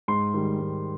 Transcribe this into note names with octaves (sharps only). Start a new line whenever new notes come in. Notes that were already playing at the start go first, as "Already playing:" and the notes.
G#2 C6
D#3 G3
G#2